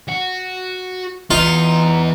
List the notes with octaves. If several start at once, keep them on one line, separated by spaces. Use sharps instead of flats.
F#4
E3 B3 D#4 F4